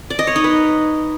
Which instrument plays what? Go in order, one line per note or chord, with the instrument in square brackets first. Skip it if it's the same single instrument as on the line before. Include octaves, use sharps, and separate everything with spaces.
[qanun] D5
D#5
C#5
D#4
B4